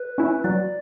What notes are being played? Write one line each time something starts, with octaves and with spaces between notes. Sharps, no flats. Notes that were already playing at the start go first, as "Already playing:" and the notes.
Already playing: B4
C#4 E4
F#3 D5